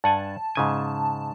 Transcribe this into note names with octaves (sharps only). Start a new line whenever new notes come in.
G2 F#5 G#5 A5
G#2 C#3 G#5